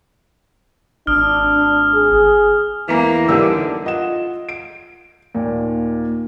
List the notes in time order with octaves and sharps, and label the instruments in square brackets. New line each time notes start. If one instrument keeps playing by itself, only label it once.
[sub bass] G#1 [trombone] D4 [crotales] D#6 F6
[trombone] G#4
[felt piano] E2 A#5 [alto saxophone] E3 [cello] A#3
[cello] D3 [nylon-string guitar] D#3 G3 [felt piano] E6
[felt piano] F4 D#5 F#5 E7
D7
D#2 A#2